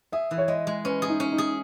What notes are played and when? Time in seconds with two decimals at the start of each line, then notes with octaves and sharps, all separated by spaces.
0.12 G#4 E5
0.31 E3
0.38 C#5
0.48 G#3 D#5
0.67 G#3
0.84 C#4 B4
1.02 G#4
1.08 D#4
1.20 C#4
1.32 D#4
1.38 G#4